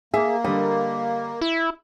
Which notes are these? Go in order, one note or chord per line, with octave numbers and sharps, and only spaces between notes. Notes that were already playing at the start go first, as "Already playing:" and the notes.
A#3 G#4 E5
D3 G3 D#5
E4